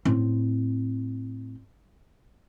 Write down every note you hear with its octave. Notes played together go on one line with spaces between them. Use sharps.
A2 C4